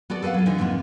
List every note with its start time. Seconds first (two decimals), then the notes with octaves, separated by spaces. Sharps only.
0.10 B3 F#4 A4 D5
0.23 A4 B4 D5 F5 F#5
0.34 F#3 F4
0.46 D3 E3 D#4
0.58 F2 G#2 A#3 B3 E4 F4